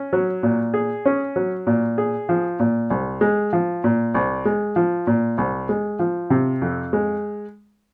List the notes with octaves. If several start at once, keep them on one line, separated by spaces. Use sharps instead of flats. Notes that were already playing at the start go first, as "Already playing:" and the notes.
Already playing: C#4
F#3
A#2
G#4
C#4
F#3
A#2
G#4
F3
A#2
C2
G#3
F3
A#2
C2
G#3
F3
A#2
C2
G#3
F3
C3
F2
G#3